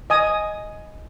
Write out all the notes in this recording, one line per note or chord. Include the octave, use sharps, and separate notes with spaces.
D#5 G#5 D#6